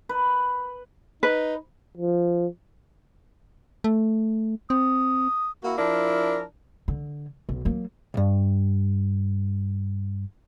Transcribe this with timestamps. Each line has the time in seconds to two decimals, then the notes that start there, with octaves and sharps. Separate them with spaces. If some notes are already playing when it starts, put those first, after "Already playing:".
0.09 B4
1.23 D#4 B4
1.98 F3
3.84 A3
4.70 C4 D#6
5.63 A#3 E4 F#4
5.78 F3 D4 E4 A#4
6.88 D3
7.49 B1
7.65 F#3 A#3
8.14 C2 G2